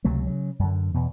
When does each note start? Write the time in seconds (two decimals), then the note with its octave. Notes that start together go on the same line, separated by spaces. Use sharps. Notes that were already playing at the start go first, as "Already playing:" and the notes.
0.04 C#2 C3 F#3 A3
0.27 C#3 F#3
0.59 F#2 D3
0.94 E2 B2